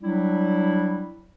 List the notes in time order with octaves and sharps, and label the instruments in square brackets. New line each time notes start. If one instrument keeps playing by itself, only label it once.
[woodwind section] F#3 G3 D4 E4